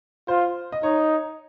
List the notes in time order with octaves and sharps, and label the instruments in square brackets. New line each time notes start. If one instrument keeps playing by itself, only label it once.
[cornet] F4 [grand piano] C5
[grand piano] D#5
[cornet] D#4 [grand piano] C#5